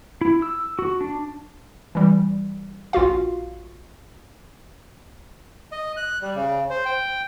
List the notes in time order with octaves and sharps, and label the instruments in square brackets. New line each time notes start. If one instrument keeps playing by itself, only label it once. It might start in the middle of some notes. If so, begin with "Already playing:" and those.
[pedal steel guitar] E4
E6
F#4
D4
[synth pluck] E3 G3
A#1 F4 F#4 F5
[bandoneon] D#5
F#6
G3
C#3
C5
G5